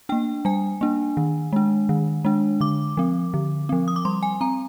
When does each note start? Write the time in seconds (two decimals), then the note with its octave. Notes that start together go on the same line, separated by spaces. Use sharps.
0.09 A#3 D4 G5
0.45 G3 G#5
0.81 A#3 D4
1.17 D#3
1.53 G#3 D4
1.89 D#3
2.25 G#3 D4
2.61 D3 D6
2.97 F3 C4
3.34 D3
3.69 F3 C4
3.88 D#6
3.96 D6
4.05 G3 C6
4.23 G#5
4.41 C4 A#5